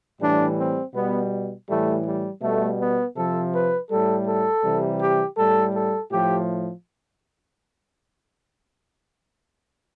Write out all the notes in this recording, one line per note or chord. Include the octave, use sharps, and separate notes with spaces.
A2 E3 G3 D4
C4
B2 G3 B3
A2 E3 G3 A3
G3
B2 G3 A3
B3
C3 F3 A4
B4
A2 G3 A4
A4
C3 E3 G3
G4
A2 G3 A4
A4
A2 F3 G4